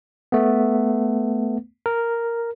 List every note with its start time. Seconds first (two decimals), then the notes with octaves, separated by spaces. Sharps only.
0.32 A3 B3
1.86 A#4